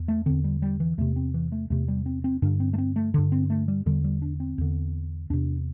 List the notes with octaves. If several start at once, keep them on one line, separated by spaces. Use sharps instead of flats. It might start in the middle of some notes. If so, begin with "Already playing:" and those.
Already playing: E2
A3
E2 D3 C4
G3
G3
E3
E2 C3 A3
C4
E3
A3
E2 C3 A3
G3
C4
C4
G2 D3 D4
C4
A3
C4
A3
G2 D3
C4
A3
G3
E2 D3 G3
G3
D4
C4
E2 D3
E2 C3 D4